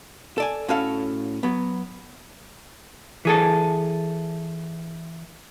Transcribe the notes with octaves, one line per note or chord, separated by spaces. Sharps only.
A4 D5 G#5
A2 C#4 F#4 A4 F5
F#3 B3
E3 G#4 A4